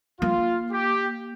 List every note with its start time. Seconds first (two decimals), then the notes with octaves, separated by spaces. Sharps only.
0.21 A#3 F4
0.72 G4